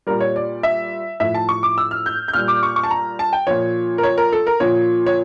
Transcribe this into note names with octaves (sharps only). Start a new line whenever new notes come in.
A#2 G3 A#4
C#5
D5
E5
A2 F3 E5
A5
C#6
D6
E6
F6
G6
G6
A#2 G3 F6
D6
C#6
C#6
A5
A#5
A5
G5
A#2 F3 C#5
A#4
C#5
A#4
A4
A#4
A#2 F3 C#5
C#5